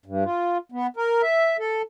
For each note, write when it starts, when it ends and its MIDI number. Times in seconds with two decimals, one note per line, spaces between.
0.06 0.24 43
0.25 0.58 65
0.72 0.87 59
0.97 1.22 70
1.22 1.57 76
1.59 1.82 69